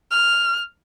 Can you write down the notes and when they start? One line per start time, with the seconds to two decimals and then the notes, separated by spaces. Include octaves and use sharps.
0.11 F6